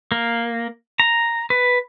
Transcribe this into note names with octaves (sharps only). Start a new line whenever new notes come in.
A#3
A#5
B4